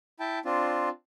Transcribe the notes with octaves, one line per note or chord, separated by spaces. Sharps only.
E4 G5 A5
C4 D4 F4